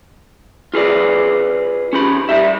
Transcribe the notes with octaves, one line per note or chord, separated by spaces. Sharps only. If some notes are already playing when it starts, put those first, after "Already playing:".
F4 G#4 B4 D5
C#4 G4 B5
G3 G4 E5